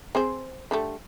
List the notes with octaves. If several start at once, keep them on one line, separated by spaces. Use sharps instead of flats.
C4 G#4 C5
D3 G3 A3